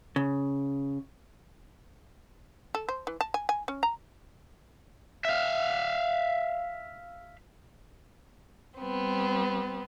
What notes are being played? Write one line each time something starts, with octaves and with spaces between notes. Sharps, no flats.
C#3
A4
C5
E3
A5
G#5
G#5
C#4
A#5
E5 F5
G3 B3 C4